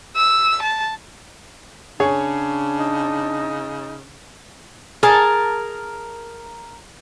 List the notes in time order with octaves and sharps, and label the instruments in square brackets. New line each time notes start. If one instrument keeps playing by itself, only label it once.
[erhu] E6
A5
[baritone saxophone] C#3 [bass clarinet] D4 [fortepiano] G#4 C#5
[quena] D#4
[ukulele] G#4 [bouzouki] A#4 A5